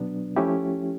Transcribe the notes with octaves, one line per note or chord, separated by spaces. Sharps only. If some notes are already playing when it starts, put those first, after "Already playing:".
Already playing: B2 F#3 B3 D4
F3 A3 C#4 E4 G4